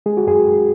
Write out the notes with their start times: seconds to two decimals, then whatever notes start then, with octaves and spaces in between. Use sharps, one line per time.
0.06 G#3 G#4
0.17 F#4
0.27 F#2 G#4
0.47 F#2